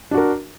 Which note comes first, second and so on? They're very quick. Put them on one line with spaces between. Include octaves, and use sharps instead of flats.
D4 F#4 A#4